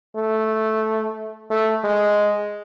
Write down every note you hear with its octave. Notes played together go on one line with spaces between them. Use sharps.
A3
A3
G#3